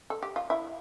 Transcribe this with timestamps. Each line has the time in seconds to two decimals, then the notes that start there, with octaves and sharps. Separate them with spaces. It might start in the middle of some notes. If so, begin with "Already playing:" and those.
0.10 A4
0.23 G4
0.36 F4
0.50 E4